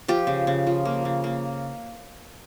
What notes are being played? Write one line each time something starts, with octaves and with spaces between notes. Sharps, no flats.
F3 G4
C#3
C#3
F3
A#3
C#3
A#3